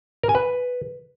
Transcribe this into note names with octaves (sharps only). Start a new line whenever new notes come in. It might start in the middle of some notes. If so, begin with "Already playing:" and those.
A#4
G#5
B4